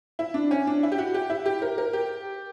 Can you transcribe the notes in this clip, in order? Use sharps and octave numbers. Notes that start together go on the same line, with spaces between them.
E4
D4
C#4
D4
E4
G4
F#4
G4
E4
G4
A#4
A#4
G4